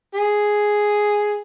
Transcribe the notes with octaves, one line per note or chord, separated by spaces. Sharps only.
G#4